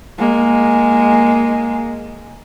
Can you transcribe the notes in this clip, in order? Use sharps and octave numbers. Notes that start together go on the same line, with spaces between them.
G#3 A#3